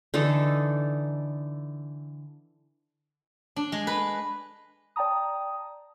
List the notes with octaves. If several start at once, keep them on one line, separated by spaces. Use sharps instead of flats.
D3 E3 D#4 A4
D4
G#3
B4
D5 G5 A5 A#5 D#6